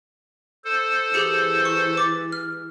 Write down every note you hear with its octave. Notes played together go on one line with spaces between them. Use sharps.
A4 C5
E3 G4 G#4 C#7
C#6
D6 A6
F6